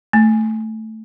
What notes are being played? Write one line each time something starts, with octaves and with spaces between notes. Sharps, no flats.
A3